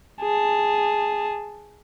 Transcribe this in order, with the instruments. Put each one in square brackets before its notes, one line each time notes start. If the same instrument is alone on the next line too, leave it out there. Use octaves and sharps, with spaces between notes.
[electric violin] G#4 A5